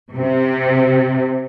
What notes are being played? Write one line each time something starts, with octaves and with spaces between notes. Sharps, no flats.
C3